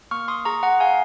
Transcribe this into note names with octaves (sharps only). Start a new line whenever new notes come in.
A#3 C#6 F6
C6 D#6
G#4 A#5 C#6
F#5 A#5
G#4 F5 G#5